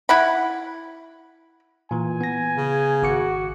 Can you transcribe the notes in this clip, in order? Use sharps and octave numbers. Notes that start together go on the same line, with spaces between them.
E4 F#5 B5
A#2 E3 G#5
B3 A#6
C#3
G#1 F#4 D6 C#7